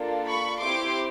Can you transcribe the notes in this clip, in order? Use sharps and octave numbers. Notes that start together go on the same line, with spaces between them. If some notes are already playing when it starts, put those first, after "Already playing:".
Already playing: A#3 D4 F4 A4
B5 C#6
C4 E4 G4 C6 D6